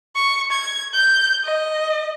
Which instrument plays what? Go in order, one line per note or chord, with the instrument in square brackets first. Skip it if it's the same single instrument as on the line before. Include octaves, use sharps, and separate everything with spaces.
[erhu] C#6
G#6
G6
D#5